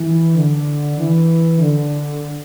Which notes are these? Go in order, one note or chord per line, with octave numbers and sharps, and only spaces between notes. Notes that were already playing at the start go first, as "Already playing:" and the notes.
Already playing: E3
D3
E3
D3